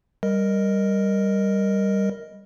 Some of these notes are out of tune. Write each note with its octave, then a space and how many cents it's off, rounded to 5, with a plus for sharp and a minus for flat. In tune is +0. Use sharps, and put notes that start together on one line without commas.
G3 +0 A#4 +0 D#5 +0